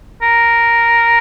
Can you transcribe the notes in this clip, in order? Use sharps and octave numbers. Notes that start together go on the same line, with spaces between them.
A#4